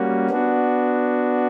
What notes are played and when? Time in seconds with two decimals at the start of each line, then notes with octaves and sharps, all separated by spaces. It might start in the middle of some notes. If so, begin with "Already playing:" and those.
Already playing: G3 A#3 C#4 F#4
0.30 B3 D4 F#4